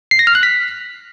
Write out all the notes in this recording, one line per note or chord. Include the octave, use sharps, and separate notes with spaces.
C7
A#6
F6
F#6
B6